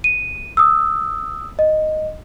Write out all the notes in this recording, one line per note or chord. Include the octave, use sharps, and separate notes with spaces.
D#7
D#6 E6
D#5